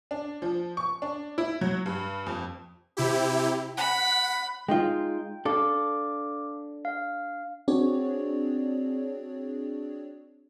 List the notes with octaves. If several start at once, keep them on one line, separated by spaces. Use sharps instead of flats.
D4
F3
C#6
D4
E4
F#3
G2
F2
C3 E4 G4
F#5 B5
G#3 D#4 F4 G5
D4 A4 F5 D6
F5
C4 D4 F#4 G#4 C#5 D5